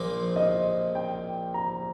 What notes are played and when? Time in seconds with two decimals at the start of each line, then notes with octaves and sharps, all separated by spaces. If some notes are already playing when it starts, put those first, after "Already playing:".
Already playing: A#1 A#2 F3 C6
0.36 D#5
0.95 G5
1.54 A#5